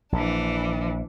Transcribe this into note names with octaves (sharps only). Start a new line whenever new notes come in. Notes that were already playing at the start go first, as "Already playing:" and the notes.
A#1 E3 D4